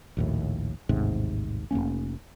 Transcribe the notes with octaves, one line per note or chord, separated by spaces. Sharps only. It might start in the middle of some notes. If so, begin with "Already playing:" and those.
A#1 D#2 A2
A1 D#2 G#2 C3
F1 G2 A#3 C#4